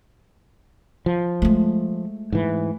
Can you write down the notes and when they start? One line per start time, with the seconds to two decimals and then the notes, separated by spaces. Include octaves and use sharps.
1.06 F3
1.42 G#3 A3
2.32 G#2 E3